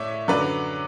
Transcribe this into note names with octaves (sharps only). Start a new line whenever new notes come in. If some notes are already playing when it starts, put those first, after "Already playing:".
Already playing: A2 C#5 D5 E5
F#2 D3 F#3 B4 D5